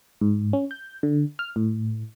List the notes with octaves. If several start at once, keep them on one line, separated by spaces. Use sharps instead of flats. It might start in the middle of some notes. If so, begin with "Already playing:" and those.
G#2
C#4
G6
D3
F6
A2